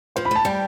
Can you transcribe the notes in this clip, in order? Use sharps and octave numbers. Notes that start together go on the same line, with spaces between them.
F3 C5
B5
A3 A5
G3 G5